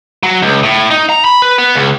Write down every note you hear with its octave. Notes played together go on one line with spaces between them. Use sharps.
F#3
C#2
A2
D#4
A#5
B5
B4
B3
C#2